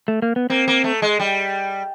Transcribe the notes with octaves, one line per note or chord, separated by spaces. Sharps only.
A3
A#3
B3
A#3 C4
A#3
A3
G#3
G3